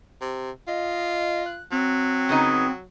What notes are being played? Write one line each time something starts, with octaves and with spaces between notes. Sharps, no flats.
C3
F4 D#5
F#6
F#3 C4
C#3 B3 D#4